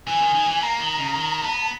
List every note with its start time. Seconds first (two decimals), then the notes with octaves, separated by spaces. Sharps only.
0.08 E3 G#5
0.22 D#3
0.35 D#3
0.48 E3
0.61 A#3 A#5
0.79 D#3
0.98 C#3
1.15 D#3
1.41 B3